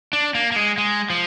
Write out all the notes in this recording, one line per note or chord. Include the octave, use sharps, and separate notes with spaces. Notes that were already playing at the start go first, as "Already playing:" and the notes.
D4
A#3
A#3
G#3
G#3
F3